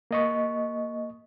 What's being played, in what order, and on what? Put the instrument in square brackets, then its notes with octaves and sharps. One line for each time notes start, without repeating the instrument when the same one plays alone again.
[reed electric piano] A#3 D#5 C#6